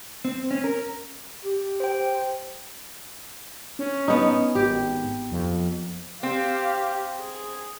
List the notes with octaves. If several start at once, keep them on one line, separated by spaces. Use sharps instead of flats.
C4
C#4
A#4
G4
C5 G5
C#4
B3 D#4
G#1 G4
F2
C4 G4 F5
G#4